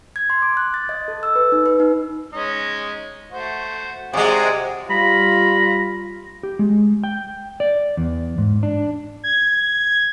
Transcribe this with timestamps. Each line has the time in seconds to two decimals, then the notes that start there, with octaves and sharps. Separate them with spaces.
0.16 G#6
0.30 C6
0.42 D6
0.57 F#6
0.74 A6
0.89 D#5
1.08 A4
1.23 E6
1.36 B4
1.52 D#4
1.66 B4
1.80 D#4
2.33 G#3 C#4 D#4
3.31 A3 F#4 C5
4.13 C3 G#3 F#4 G#4 D5
4.90 G3 F4 A#5 B5
6.43 G4
6.59 G#3
7.04 G5
7.60 D5
7.97 E2
8.38 G#2
8.63 D4
9.24 G#6